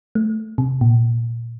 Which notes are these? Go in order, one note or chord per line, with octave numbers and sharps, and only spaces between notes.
A3
C3
A#2